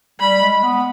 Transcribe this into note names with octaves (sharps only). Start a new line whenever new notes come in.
G3 B5
G#3
B3